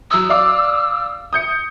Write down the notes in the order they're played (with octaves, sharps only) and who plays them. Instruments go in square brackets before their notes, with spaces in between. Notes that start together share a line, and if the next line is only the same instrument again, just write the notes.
[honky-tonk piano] F#3 D#6 [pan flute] E6
[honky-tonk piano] D5 F5 D6
D#6 G6 C#7